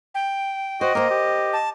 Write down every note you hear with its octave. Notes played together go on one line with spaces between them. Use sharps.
G5
F#4 C5 D#5
A#3 A#4 C5
G4
A5